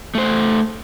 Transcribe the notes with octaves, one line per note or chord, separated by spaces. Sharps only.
A3 C5